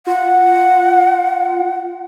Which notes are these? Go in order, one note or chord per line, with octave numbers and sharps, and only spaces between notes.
F4 F#5